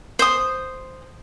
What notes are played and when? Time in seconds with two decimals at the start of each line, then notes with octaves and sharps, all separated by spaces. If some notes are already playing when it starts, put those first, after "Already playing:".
0.19 C5 D#6